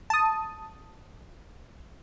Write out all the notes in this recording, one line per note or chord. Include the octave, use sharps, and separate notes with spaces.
A5 D#6